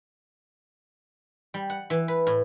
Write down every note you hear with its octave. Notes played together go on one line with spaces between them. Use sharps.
G3
F#5
E3
B4
A2